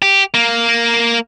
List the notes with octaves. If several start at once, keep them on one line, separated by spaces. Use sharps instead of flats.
G4
A#3